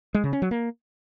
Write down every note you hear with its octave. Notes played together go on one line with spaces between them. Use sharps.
G#3
C#3
C#4
F#3
A#3